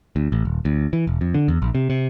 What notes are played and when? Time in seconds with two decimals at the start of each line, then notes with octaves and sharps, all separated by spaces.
0.16 D2
0.32 A1
0.45 D#1
0.65 D2
0.93 E3
1.07 E1
1.21 F2
1.34 D3
1.48 E2
1.62 A#1
1.75 C3
1.90 C3